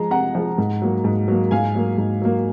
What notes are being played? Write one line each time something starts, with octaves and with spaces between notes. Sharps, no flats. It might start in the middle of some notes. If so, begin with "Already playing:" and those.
Already playing: F3 G#3 A#5
C3 F#5 A#5
F3 G#3
G#2
F#3 A#3
G#2
F#3 A#3
G#2 F5 G#5
F#3 A#3
G#2
F#3 A#3